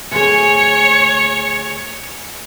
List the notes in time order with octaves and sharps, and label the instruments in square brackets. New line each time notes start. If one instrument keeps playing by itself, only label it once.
[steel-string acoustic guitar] D2 G#4 [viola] C#5 [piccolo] C#7